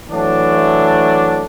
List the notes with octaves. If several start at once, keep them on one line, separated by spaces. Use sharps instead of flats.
E3 F#3 A3 D4